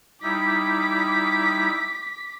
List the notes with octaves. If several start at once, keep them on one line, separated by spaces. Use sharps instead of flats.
G3 D#4 E4 D6 B6